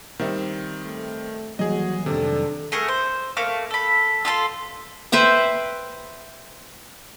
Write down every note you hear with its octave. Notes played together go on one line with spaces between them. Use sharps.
D#3 G3 C4 A#4 E5
A3
D#2 E3 F#3 G3 F#4 G#4 D#5
F1 C3 D#3 F#3 G3 D4 A4
A3 G#4 A#4 F#5
C5
A3 A#3 F5 C#6
A4 B5
F4 A4 A5 C6
B4 C5 E5 G5